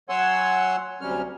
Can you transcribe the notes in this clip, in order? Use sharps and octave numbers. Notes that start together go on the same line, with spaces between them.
F#3 C#5 F#5 G#5 C6 E6
D2 C3 F#3 G3 C#4 F6